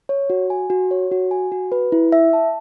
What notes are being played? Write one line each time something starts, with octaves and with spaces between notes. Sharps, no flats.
C#5
F#4
G#5
F#4
C#5
F#4
G#5
F#4
B4
E4
E5
A5